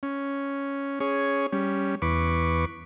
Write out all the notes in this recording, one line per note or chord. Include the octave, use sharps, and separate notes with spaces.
C#4
C#4 G#4 C#5
G3 C#4
E2 B4 C#6 D6